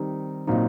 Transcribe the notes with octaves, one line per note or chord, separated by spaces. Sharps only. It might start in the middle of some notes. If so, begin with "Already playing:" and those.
Already playing: D#3 G3 C4 D#4
A#2 F#3 C4 D#4